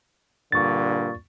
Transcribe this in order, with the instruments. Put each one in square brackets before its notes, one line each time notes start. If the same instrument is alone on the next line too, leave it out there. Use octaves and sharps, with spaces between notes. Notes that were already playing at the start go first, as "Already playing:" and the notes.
[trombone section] G2 A#2 D3 [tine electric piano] C#6 A6